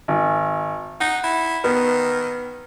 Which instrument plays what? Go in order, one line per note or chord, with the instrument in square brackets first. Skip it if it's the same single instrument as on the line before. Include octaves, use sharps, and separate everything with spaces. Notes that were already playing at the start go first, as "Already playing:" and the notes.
[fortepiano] G#1
[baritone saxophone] D#4 [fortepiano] F#5
[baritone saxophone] E4
[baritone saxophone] D#3 [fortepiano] B3